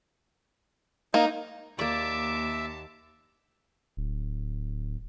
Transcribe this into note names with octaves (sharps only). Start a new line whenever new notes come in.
A#3 D#4
D#2 A#3 D5 E5 A5 D6
D1